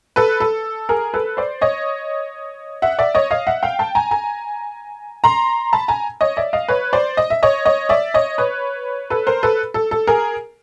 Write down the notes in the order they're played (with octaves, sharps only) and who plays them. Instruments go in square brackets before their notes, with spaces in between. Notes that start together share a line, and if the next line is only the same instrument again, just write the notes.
[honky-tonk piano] A4 B4
A4
G#4 A#4
A4 B4
C5 D5
C#5 D#5
E5 F#5
D5 E5
C#5 D#5
D#5 F5
E5 F#5
F5 G5
G5 A5
G#5 A#5
G#5 A#5
A#5 C6
A5 B5
G#5 A#5
C#5 D#5
D5 E5
D#5 F5
B4 C#5
C5 D5
D#5
E5
C#5 D#5
C#5 D#5
D5 E5
C#5 D#5
B4 C#5
A4 B4
A#4 C5
A4 B4
A4
A4
G#4 A#4